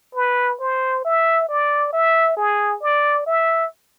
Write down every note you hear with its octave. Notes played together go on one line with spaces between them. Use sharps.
B4
C5
E5
D5
E5
G#4
D5
E5